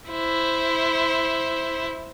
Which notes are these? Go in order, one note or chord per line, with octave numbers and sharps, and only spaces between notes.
E4 C5